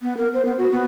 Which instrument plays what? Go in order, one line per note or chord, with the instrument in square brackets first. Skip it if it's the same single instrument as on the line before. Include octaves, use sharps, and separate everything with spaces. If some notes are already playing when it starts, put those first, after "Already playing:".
[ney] B3
A#4
C5
B3
F#4
B3